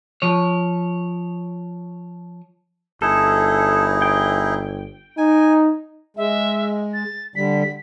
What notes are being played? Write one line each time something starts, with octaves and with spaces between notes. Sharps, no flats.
F3 C#5
G1 D#4 E4 G#4 A4
G5
D#4 G#5
G#3 E5
A6
D3 G3 B6